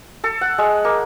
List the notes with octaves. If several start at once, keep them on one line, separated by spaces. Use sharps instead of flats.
A4
F#5
G#3
A#3